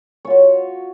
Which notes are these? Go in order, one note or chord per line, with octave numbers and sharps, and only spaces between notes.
F4 F#4 C#5